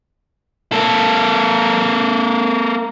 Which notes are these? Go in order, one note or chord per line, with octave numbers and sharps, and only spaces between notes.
A#3 A4